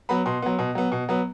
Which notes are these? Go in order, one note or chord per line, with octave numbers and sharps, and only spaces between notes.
F#3 B3 B5
B2 C6
F#3 B3
B2
F#3 B3
B2
F#3 B3